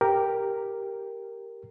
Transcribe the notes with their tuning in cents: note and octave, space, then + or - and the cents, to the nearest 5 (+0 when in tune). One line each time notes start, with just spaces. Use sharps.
G4 +0 A#4 +0